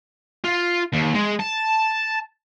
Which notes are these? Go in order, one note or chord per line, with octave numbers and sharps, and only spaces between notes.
F4
D#2
G#3
A5